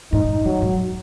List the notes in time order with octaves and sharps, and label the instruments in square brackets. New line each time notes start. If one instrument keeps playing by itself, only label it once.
[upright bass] G#2 [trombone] D#4
[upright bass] G#2
[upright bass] F#2 [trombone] F#3
[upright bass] G#2